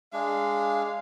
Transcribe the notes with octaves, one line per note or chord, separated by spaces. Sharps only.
G#3 D4 F5